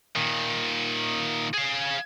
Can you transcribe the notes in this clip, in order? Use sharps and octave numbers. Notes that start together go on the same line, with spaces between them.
A#2 D#3
G#4 F5